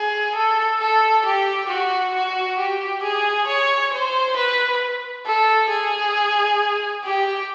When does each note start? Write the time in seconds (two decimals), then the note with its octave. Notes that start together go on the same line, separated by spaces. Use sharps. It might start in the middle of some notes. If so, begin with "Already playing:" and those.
Already playing: G#4
0.36 A4
0.80 A4
1.25 G4
1.69 F#4
2.14 F#4
2.59 G4
3.03 G#4
3.47 C#5
3.93 C5
4.36 B4
5.26 A4
5.70 G#4
7.04 G4